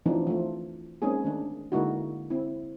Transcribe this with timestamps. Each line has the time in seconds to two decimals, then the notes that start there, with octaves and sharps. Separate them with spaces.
0.06 E3 F3 A3 C4 D4 D#4
0.27 F3 A3
1.02 G#3 A#3 C4 C#4 D#4 G#4
1.24 D#3 A3 D4
1.72 D3 G#3 A#3 D#4 E4 F#4
2.30 C4 E4